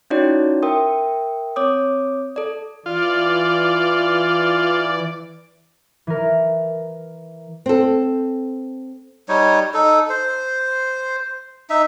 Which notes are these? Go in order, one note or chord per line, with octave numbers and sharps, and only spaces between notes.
C#4 D#4 E4 F#4 C#5 D5
A#4 E5 G5 C6 D#6
C4 C#5 D6 D#6
A4 D5
E3 F4 D5
E3 A#4
C4 A4
G3 D#4 C#5
D#4 A4
C5
D#4 E5